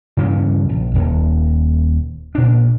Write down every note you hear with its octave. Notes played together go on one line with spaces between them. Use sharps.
G2 C#3 E3 C#4
A#1
D#1
A#2 D4